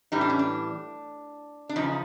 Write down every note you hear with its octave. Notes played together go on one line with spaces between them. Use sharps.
A2 E3 G3 D#4
D4
C#4
D4
D4
E2 C#3 F3 D#4